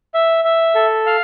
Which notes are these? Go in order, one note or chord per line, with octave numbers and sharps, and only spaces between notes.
E5
E5
A4
F5